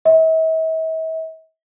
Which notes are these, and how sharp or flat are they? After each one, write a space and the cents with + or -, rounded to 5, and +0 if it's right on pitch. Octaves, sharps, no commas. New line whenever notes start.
E5 -45